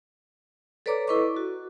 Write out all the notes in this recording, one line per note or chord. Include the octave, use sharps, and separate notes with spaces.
A4 B4 C#5 D5 A#5 D6
E4 A4 B4 D#5 C#6 D6
F#4